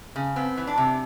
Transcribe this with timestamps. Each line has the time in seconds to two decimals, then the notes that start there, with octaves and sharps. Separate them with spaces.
0.16 C#3
0.36 B3 C4
0.57 E3
0.67 D4
0.78 C3